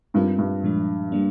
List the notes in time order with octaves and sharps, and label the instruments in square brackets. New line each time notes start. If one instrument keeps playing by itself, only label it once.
[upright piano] G2 [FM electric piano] G3 C4 F4 A#4
[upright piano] G2
[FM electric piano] A#2 F3 G#3 D4
G3 A#3 D4